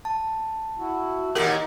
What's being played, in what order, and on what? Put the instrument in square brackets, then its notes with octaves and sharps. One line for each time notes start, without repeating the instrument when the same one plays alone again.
[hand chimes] A5
[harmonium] E4 F#4
[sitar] D#2 A#2 G4 [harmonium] D#4 [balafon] A#4